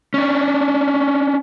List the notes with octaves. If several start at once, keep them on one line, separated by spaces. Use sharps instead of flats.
C#4 D4